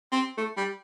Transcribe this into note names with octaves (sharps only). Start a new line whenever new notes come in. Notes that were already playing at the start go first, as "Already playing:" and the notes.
C4
A3
G3